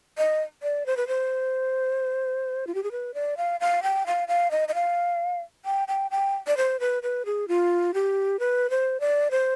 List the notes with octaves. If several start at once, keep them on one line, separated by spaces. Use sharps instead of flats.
D#5
D5
C5
B4
C5
F4
G4
G#4
B4
D5
F5
F5
G5
F5
F5
D#5
D#5
F5
G5
G5
G5
D5
C5
B4
B4
G#4
F4
G4
B4
C5
D5
C5